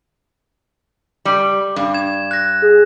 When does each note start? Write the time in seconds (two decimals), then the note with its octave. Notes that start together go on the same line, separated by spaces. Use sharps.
1.25 G3
1.76 G2
1.94 G#6 E7
2.31 F#6 A#6
2.62 G#4